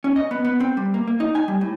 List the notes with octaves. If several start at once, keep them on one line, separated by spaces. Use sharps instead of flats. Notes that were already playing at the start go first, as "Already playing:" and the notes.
C#4
D#5
B3
B3
C4
G3
A#3
A#3
D#4
G#5
G3
A2